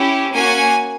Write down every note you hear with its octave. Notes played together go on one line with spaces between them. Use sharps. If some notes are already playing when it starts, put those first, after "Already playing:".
Already playing: C#4 E4 G4
A#3 C#4 F#4 G#5